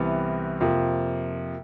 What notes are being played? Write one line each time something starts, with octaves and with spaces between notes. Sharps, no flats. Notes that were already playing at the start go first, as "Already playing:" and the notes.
Already playing: C2 C3 E3 G3 B3
F2 C3 F3 A#3